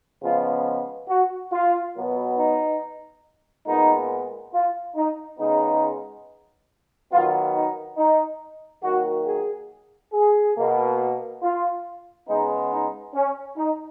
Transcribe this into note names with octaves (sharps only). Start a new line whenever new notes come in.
C#3 F3 G#3 B3 F4
F#4
F4
B2 F#3 B3
D#4
A#2 G#3 B3 D#4
F4
D#4
C#3 G#3 B3 D#4
D#3 F#3 B3 F4
D#4
D#4
D#3 F#3 A#3 F#4
G#4
G#4
B2 A#3
F4
C#3 G#3 B3 D#4
D#4
C#4
D#4